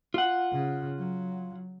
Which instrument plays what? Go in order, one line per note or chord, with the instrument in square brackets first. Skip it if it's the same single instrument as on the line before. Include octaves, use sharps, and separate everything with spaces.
[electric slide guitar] F4 F#5
[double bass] C#3
F#3